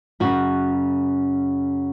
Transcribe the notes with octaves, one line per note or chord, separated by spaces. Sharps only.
F#2 C#3 F#4